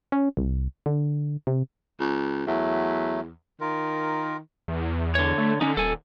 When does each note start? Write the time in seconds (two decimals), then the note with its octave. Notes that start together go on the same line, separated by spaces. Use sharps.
0.12 C#4
0.37 C2
0.86 D3
1.47 C3
2.00 C#2
2.47 E2 F#3 A3
3.61 D#3 F4 A#4
4.68 E2
5.15 D3 C#5
5.38 A3
5.61 D3 C#4 D#4
5.77 D#1 A4 G#5